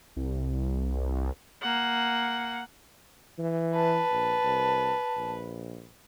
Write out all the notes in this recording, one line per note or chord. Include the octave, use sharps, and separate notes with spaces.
C2
A#3 F#5
E3
B4 A5
A#1
C2
A#1